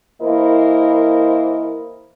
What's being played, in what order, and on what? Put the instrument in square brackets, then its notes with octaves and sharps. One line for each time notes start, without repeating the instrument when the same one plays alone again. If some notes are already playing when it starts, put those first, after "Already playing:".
[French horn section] E3 A#3 E4 A#4 C5 D#5